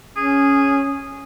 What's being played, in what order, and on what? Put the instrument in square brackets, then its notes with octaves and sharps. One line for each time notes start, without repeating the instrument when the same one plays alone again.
[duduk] C#4 [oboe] G#4